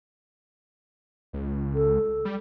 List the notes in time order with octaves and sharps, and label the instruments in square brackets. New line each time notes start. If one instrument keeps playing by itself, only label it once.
[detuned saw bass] C#2
[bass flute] A4
[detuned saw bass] G3